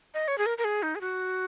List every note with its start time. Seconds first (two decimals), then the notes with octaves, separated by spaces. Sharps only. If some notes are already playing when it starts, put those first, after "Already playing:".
0.14 D#5
0.28 C#5
0.38 G#4
0.46 A#4
0.58 A#4
0.64 G#4
0.83 D#4
0.95 G#4
1.01 F#4